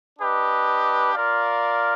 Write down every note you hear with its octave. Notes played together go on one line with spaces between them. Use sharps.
D4 G4 B4 D#5
F4 A#4 D5 F5